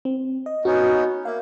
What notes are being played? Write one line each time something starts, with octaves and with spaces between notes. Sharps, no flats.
C4
D#5
B3 C#4 D#4 F#4
A#3 E5 F5